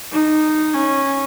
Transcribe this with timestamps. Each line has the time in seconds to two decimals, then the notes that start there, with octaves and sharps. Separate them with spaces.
0.12 D#4
0.73 C#4